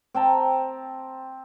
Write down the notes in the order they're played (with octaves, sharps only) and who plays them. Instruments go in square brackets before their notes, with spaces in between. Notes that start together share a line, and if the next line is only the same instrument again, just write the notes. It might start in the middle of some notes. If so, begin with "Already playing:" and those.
[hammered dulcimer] C4 G5 A5 A#5